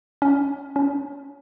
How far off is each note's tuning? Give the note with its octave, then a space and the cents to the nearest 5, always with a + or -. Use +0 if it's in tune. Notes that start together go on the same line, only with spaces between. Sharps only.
C#4 +20
C#4 +30